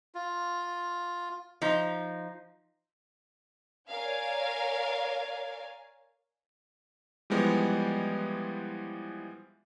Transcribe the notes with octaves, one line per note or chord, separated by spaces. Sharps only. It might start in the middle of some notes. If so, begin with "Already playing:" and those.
F4
F3 D#4
A#4 C#5 D5 F5 G#5
E3 F3 G3 G#3 B3